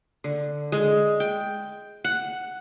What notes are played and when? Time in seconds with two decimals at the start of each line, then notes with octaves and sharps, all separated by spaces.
0.24 D3
0.72 G#3
1.20 G5
2.04 F#5